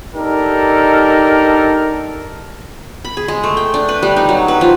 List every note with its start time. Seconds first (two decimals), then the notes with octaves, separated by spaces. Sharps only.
0.15 D4 D#4 G4 A4 A#4
3.05 B5
3.17 G#4
3.28 G#3
3.44 A3
3.57 G5
3.74 D4
3.89 B4
4.03 G3
4.17 D#4
4.29 F#3
4.48 B4
4.61 F3